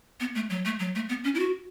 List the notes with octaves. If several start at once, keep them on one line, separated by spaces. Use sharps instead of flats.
B3
A3
F#3
A3
F#3
A3
B3
C#4
E4
F#4